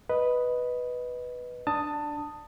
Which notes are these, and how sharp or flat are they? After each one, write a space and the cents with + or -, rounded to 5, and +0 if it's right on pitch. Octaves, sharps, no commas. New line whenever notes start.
B4 +0 D#5 +0
D4 +0 A5 +20 D#6 +0